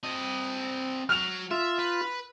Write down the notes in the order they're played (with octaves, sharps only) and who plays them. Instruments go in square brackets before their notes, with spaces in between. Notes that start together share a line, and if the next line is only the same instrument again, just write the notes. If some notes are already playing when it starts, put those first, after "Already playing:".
[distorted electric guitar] C4 D#5
[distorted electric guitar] F#3 F#4 [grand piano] F6 F7
[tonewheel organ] F4 [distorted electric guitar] E5
[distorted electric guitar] B4